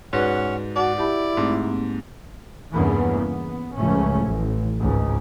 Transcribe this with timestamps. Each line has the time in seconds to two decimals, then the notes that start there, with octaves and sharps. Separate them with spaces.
0.13 G#2 C#4 F#4 B4 D5 F#5
0.76 F#4 D5 F#5
0.98 E4 G4 A5 B5
1.37 G#2 A3 C4 D6
1.64 A#3 C4
2.73 E2 G2 C#3 E3 A#3 B3
3.20 B3
3.76 C#2 F#2 A2 F3 A3 C#4
4.25 A1
4.78 G#1 C#2 G#2